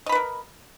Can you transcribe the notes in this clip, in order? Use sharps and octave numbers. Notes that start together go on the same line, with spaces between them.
A#4 B4 D#5 B5